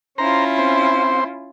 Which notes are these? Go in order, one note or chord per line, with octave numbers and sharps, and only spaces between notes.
C#4 E4 F4 C5 A#5
C4 C5